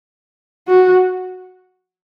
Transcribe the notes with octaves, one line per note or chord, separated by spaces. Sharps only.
F#4